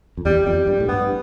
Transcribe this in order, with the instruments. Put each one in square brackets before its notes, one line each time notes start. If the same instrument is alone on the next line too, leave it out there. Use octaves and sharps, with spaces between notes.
[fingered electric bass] F2
[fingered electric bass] E2 [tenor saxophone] G3
[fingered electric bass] F2 [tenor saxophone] G3
[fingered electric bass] G2 [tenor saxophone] G3
[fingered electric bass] A2
[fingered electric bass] G2 [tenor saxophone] B3